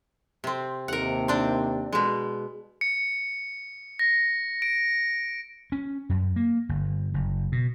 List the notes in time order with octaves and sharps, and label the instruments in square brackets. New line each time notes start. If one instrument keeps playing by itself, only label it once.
[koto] C3 C4
[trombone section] D#2 C3 [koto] A#4 F#5
[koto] C4 D4
B2 G#3
[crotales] C#7
A#6
D7
[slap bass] C#4
F#2
A#3
G1
F#1
B2